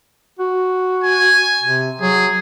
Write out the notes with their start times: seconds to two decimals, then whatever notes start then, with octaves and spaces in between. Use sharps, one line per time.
0.39 F#4
1.04 G#5
1.63 C3
2.01 F#3 G#4